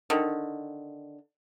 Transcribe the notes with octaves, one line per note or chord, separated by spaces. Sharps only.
D3 D#3